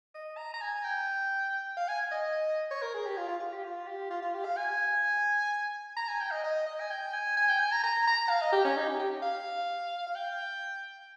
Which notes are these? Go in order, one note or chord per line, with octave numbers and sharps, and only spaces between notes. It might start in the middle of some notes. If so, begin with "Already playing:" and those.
D#5
A#5
A#5
G#5
G5
F5
G#5
D#5
C#5
A#4
G#4
G4
F4
F4
F4
G4
F4
G4
F4
F4
G4
F5
G#5
A#5
G#5
G5
D#5
D#5
D#5
G#5
G5
G#5
G#5
G5
G#5
A#5
A#5
A#5
F5
D#5
G4
C#4
D#4
G4
G4
F5
F5
G5